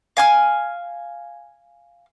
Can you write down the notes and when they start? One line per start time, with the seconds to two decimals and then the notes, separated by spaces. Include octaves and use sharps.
0.17 F5 G#5 F6